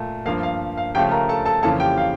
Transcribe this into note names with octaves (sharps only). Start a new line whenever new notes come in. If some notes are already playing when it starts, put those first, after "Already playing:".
Already playing: A#2 A3
G2 F3 A#3 F5
F5
F5
C#3 F3 A3 G4 G5
A#4 A#5
A4 A5
A4 A5
F2 C#3 E3 A#3 A4 A5
G4 G5
F5